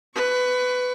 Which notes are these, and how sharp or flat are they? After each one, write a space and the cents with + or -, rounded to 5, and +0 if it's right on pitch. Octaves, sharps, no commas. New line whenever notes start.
B4 +15 C#6 +25